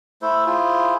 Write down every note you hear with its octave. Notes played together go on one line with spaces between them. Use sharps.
A3 E4 A4 C5
E4 F4 G#4 C5